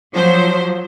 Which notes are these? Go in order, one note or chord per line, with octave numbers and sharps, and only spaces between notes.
F3 F#3 C5